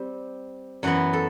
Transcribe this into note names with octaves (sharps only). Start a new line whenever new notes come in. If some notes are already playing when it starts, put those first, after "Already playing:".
Already playing: G3 C4 G4
F#2 E3 B3 F#4
A4